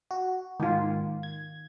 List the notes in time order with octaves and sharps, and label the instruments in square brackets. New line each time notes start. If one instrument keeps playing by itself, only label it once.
[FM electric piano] F#4
[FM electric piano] G#2 [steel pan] D#3 F4
[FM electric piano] G#6